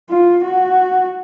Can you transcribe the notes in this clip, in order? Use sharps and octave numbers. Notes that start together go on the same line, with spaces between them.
F4
F#4